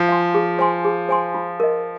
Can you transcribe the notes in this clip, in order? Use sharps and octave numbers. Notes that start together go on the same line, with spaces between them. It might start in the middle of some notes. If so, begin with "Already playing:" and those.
Already playing: F3
F5 G#5 C6
G#4
C5 G#5 C6
G#4
C5 G#5 C6
F4
A#4 D#5